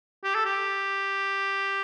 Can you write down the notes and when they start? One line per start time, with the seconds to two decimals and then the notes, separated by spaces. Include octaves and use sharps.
0.24 G4
0.35 A4
0.46 G4